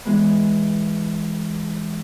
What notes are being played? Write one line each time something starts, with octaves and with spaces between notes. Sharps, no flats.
E3 G#3 B3